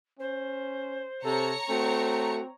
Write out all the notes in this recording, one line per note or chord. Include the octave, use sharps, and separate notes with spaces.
C#4 C5
C3 A4 C#5 A#5 C#7
A3 C4 F#4